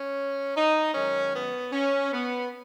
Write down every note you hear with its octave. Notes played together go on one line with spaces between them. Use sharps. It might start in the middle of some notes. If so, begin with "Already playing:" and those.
Already playing: C#4
D#4
F#2 D#3 G#3 C#4
B3
C#4
B3